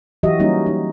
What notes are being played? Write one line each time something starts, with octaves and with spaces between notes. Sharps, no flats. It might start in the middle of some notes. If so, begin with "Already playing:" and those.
E3 F#3 F#4 G4 D#5 E5
F#3 G3 A#3 C#4 D#4 F#4
D#4